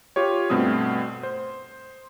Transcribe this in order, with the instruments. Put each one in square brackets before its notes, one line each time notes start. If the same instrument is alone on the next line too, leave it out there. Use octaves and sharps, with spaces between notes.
[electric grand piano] F4 G4 C#5
G2 B2 A3 C4 D#6
C5